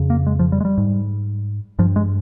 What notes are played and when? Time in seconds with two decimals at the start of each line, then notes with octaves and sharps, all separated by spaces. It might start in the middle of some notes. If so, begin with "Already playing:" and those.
Already playing: F2 C#3
0.10 A#3
0.27 G#3
0.39 F3
0.52 G3
0.60 G#3
0.65 G3
0.78 G#2
1.79 G2 F3
1.96 G#3